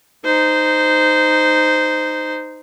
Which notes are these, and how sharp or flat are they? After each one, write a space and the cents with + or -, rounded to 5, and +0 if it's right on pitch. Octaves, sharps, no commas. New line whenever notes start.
D#4 -10 C5 -15